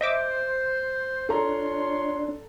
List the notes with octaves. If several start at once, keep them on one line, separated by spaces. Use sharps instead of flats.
C5 D#5 E5 D6
D4 F4 A4 C#5 A#5 C6